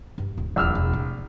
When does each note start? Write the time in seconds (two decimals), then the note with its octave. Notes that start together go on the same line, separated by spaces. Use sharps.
0.18 G2
0.37 D1
0.56 D#1 A#1 E4 E6 F6
0.75 E1
0.93 A2